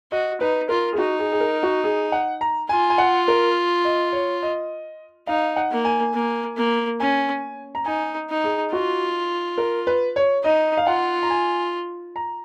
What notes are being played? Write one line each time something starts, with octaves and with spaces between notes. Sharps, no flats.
F#4 D#5
D#4 B4
F4 A#4
G#4
D#4 F#4
G#4
G#4
A#4
F#4
G#4
F#5
A#5
F4 G#5
G#5
F#5
A#4
D#5
C#5
D#5
D#4 F5
F#5
A#3
G#5
A#3
A#3
C#4 G#5
A#5
D#4 G#5
D#4
G#4
F4 F#4
A#4
B4
C#5
D#4 D#5
F5
F4 F#5
A#5
G#5
A#5